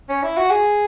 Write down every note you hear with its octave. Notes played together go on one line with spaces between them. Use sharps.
C#4
E4
F#4
G#4